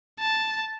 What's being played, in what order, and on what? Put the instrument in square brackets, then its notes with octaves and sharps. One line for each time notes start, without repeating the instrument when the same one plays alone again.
[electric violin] A5